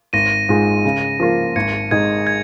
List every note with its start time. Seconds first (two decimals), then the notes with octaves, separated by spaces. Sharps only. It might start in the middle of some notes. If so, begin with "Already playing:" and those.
0.13 G#1 A#6 D#7
0.49 G#2 G#3 F4
0.85 C#3
1.20 F3 A#3 F4
1.56 G#1 G#6 C#7
1.91 G#2 G#3 D#4 G#4 G#6
2.27 G#6